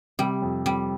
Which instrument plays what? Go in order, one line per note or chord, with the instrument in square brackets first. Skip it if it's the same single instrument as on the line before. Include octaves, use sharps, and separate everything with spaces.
[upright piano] C3 [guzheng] G3
[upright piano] F2
[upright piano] F2 [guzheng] G3